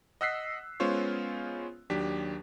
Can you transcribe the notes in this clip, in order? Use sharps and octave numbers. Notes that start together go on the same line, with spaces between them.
D#5 F#5 E6 F#6 B6 C7
G#3 B3 C#4 F4 C5 C#5
D#2 F#3 D4 G4 B6